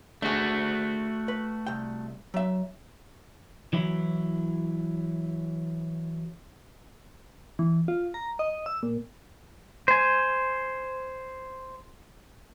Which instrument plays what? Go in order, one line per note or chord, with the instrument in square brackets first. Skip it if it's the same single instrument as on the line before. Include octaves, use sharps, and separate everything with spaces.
[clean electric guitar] A3 F#4 [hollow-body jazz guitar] D4 G#4
[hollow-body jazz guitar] B4
C2 G5
F#3 E5
[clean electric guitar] E3 F#3 E4
[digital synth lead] E3
F4
A#5
D#5
E6
A#2
[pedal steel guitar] C5 G#5